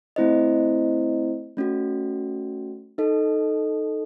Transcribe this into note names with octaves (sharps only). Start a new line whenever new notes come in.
A3 C4 E4 C5 D#5
A3 C#4 F#4
D#4 A4 D#5